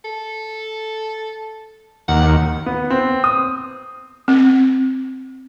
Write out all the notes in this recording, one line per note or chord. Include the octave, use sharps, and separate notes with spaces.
A4
D#2 F#5
B3
C4
D#6
C4